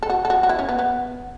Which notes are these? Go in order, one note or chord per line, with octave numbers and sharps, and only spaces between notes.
A4
F#4
A4
F#4
F#4
E4
C#4
B3
B3